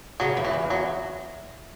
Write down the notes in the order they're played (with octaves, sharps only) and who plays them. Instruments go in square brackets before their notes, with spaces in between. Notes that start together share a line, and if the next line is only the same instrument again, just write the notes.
[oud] C#3 [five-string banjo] F#3
[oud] E2
[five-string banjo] E3
[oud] E2
[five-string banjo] F#3